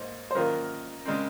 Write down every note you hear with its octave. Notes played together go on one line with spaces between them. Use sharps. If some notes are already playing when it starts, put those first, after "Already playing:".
Already playing: G#2 A#3 D#4 C5
C5
F#2 D#3 A#3 F4 A#4
C#3 G#3 C4